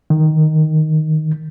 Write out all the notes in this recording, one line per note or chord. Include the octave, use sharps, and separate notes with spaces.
D#3